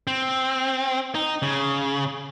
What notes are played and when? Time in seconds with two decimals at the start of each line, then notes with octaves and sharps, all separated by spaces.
0.07 C4
1.15 D#4
1.42 C#3